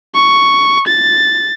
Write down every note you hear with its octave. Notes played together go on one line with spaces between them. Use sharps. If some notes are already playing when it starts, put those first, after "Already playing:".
C#6
A6